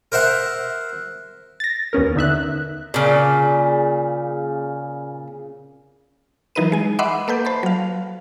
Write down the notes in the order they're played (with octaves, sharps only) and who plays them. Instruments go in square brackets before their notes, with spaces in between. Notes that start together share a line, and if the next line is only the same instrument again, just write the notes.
[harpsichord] A#4 C5 E5 F#5
[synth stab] A6 A#6
D#2 B3 C#4 A#4
D3 D#4 E5 F#6
[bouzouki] A#2 C#3
[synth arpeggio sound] E3 F#3 D#4 A#4 B4 D#7
G#3 G#5
D#5 E5 F#5 B5 C6 D6
A#3 A4 B4 G6
C5 A5 B5
F#3 F5